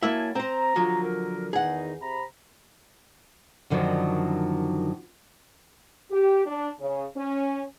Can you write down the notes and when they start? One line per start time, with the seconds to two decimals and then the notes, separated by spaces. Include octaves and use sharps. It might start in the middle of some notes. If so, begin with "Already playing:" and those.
0.03 F#3 A#3 E4 E5 G#5 A5
0.35 C4 C5 A#5
0.76 D3 F3 F#3
1.03 A#4
1.53 E2 D#3 D#4 G#4 F#5
2.01 C3 A#5 B5
3.70 F#2 D3 D#3 F3 F#3
6.10 G4
6.46 D4
6.79 C#3
7.16 C#4